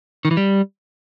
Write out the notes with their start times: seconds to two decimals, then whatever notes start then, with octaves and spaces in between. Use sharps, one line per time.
0.25 D#3
0.31 E3
0.37 G3